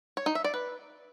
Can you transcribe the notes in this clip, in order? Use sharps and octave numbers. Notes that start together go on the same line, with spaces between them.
C#5
D#4
E5
D5
B4